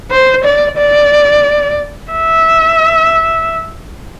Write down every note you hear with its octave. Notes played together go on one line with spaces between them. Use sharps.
C5
D5
D5
E5